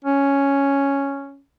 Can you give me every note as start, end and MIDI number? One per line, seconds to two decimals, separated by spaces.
0.05 1.41 61